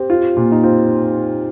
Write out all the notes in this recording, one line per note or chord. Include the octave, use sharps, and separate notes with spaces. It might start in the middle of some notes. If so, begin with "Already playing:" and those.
Already playing: C4 G4
F4
A#2
D#4
C4 F4